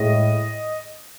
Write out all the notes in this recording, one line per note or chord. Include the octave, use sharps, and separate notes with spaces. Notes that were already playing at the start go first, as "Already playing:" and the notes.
Already playing: A2 G#3 D#5